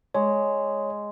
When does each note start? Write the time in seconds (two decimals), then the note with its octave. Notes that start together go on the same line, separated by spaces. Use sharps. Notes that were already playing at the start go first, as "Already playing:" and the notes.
0.14 G#3 C#5